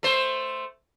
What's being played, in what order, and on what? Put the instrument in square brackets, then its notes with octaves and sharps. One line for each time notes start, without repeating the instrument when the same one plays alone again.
[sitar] A3 C5